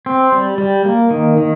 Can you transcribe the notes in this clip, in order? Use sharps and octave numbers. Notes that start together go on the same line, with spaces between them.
C4
G3
G3
A#3
D#3
D#3